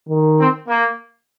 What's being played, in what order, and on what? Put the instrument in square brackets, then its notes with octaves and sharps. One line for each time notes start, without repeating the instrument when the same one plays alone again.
[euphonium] D#3
[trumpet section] C4
A#3